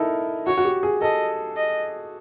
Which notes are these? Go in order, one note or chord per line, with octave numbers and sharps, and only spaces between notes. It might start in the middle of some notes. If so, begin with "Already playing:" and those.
Already playing: D#4 E4 A4 A#4
F#4 C#5
F#4
G4
G#4
A4 D#5
D#5